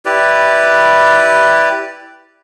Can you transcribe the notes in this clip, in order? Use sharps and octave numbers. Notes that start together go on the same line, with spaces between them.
E4 G4 B4 D5